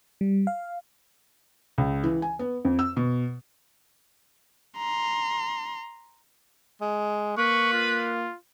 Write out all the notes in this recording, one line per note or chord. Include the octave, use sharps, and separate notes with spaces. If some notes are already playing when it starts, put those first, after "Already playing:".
G3
F5
C#2
E3
G#5
B3
F2
E6
B2
A#5 C6
G#3
A#3 B4 C#6
F4